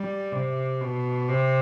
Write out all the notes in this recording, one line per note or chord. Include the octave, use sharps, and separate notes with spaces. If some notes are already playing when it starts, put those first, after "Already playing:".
Already playing: G3
C3
B2
C3